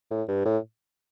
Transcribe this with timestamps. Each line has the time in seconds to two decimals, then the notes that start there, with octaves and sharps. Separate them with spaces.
0.11 A2
0.28 G2
0.45 A2